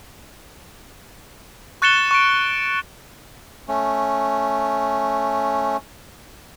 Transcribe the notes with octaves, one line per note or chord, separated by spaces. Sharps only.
C#6 F#6 A6 C#7 E7 G7
C#6 D7
A3 C#4